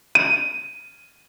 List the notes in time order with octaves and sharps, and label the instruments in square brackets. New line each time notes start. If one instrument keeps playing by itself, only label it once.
[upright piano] D#7